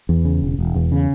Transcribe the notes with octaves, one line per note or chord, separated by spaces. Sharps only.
E2
C#3
E1
E1
E2
C#3